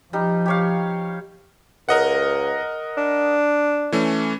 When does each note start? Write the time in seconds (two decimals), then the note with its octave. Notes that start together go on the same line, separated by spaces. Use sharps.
0.13 F3 G3 D#4
0.46 G4 C#5 F5
1.89 C#2 A#4 D#5 F#5
2.98 D4
3.92 E3 A3 C#4